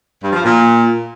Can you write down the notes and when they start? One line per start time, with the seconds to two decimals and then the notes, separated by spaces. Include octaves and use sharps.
0.22 G2
0.33 F3
0.43 A#2